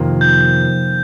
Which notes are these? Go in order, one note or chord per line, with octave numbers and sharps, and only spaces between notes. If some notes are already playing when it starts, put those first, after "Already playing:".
Already playing: F2 C3 D#3 A#3 F4
G6